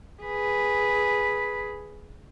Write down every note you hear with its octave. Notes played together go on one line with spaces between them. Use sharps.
G#4 B4